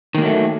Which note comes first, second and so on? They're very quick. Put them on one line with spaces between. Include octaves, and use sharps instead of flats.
D#3 A#3 F#3 A3